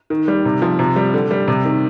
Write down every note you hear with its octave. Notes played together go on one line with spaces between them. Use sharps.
D#3
G3
C3
F3
C3
G3
D3
G3
C3
D#3